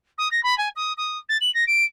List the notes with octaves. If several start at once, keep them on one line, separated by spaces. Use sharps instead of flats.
D#6
A#6
B5
G#5
D#6
D#6
A6
F#7
A#6
D7